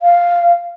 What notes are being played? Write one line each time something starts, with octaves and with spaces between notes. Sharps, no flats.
F5